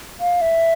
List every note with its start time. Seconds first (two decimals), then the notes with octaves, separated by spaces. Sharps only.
0.20 F5
0.41 E5